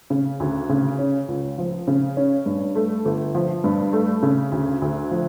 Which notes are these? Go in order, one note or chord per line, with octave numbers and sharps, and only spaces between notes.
C#3
D2
C#3
C#4
C#2
F3
C#3
C#4
G2
A3
G1
F3
G2
A3
C#3
D2
D2
F3